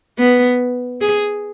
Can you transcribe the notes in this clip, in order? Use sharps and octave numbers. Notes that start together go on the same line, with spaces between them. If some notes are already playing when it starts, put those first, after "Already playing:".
B3
G#4